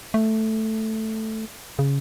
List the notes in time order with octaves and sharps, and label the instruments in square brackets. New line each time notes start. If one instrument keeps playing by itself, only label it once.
[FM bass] A3
C#3